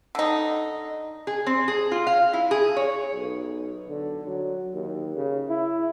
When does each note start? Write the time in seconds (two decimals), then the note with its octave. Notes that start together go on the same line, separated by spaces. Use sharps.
0.15 D3 D#4
1.27 G#4
1.47 C4
1.68 G#4
1.92 F4
2.07 F5
2.33 E4
2.51 G#4
2.77 C#5
3.14 B1
3.89 D3
4.27 F#3
4.74 D#2
5.16 C#3
5.49 E4